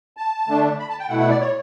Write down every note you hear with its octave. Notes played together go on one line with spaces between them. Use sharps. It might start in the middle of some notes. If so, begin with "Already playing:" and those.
A5
D3 A3 D4
B5
A5
G5
B2 A3 E4 F#5
F#5
D5
C#5